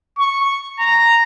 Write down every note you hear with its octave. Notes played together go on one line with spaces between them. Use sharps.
C#6
A#5